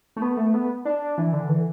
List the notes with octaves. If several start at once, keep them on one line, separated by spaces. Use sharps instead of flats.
A3
B3
A3
B3
D4
E3
D3
E3